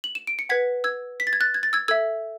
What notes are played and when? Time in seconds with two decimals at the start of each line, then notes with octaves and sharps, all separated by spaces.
0.04 F#7
0.15 E7
0.27 D7
0.39 C#7
0.49 B4 F#5 G#6 B6
0.84 E6 G#6
1.20 B6
1.27 A6
1.33 G#6
1.41 F#6 A6
1.54 G#6
1.63 A6
1.73 E6 G#6
1.88 A4 E5 E6 G#6